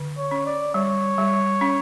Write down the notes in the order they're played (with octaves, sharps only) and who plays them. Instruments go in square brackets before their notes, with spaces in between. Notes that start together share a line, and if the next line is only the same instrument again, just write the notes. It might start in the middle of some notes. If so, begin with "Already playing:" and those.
Already playing: [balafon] D3
[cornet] C#5
[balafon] C#4
[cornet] D5
[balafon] G3 [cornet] C#5
[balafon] G3
C#4